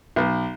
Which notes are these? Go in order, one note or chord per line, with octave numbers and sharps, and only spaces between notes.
B1